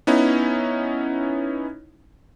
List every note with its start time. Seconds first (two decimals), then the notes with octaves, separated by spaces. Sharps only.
0.07 B3 C#4 D#4 E4